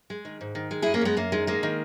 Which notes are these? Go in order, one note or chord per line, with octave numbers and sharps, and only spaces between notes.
G#3
D#3
G#2
D#3
G#3
F#2 E4 G#4
A#3 C#4
F#2 G#3 B3
F#2 A#3
D#3 G#3
G#3 A#3
D#3